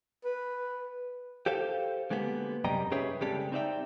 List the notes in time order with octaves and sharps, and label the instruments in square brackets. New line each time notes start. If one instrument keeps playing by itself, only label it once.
[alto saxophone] B4
[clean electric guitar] G4 A4 C5 F5
D3 G#3 A#3 B3 G4
F#2 C3 G3 D#5 G5 A#5
C#4 G4 G#4 B4 C#5 E5
C#3 G3 G#3 C4 G4 A4
C4 D#4 D5 E5 G5